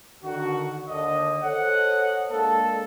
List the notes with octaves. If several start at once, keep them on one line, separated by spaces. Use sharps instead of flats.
D3 D#3 F#4
D#2 D3 D#5
A4 C5 C#5 D#5 F#5
G#3 A#3 D4 A4